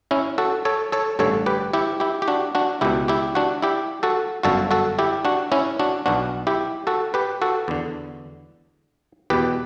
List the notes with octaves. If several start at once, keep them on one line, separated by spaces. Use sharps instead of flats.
C#4 E4
F#4 A4
A4 C#5
A4 C#5
A1 G2 D3 A4 C#5
G4 B4
E4 G4
E4 G4
G4
D4 F#4
D4 F#4
C#2 B2 E4 G4
E4 G4
D4 F#4
E4 G4
F#4 A4
G1 F#2 D3 F#4 A4
F#4 A4
E4 G4
D4 F#4
C#4 E4
D4 F#4
B1 B2 D4 F#4
E4 G4
F#4 A4
G4 B4
F#4 A4
E2 D3
E2 B2 G4 B4